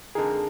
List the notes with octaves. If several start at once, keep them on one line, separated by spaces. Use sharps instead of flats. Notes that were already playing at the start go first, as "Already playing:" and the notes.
F2 D3 G#3 D#4 G#4 A#4